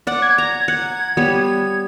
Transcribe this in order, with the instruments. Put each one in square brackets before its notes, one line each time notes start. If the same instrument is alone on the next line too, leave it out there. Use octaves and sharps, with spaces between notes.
[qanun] D5 F#5
[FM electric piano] G#6
[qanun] A#5
F#5
G3 B3 C#5